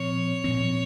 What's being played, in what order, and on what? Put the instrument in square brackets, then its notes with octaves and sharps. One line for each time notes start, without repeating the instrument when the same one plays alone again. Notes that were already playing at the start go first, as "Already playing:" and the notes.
Already playing: [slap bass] A#2 F3 C4 [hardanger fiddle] C#5
[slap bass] A#2 F3 C4